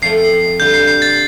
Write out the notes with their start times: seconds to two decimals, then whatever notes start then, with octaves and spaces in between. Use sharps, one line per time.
0.02 F2 F3 A3 C7
0.60 D3 G3 F4 G6
0.74 C7
0.87 C7
1.02 A6